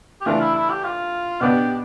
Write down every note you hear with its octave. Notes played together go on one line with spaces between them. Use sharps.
G4
E3 A3 D4 F4
E4
E4
G4
F4
B2 B3 D4 G4